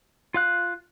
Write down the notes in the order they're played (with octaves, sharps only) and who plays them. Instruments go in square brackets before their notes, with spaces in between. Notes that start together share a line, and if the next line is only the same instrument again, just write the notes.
[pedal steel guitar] F4 F5 F#6